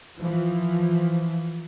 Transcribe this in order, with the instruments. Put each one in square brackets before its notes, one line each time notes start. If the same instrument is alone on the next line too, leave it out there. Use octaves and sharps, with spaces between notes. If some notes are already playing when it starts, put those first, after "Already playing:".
[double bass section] E3 F3